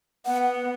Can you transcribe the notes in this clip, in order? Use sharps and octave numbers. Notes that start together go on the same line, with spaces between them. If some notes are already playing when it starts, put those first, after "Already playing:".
B3 F#5